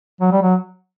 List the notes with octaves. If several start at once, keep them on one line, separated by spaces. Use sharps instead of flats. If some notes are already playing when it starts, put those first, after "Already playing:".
F#3
G3
F#3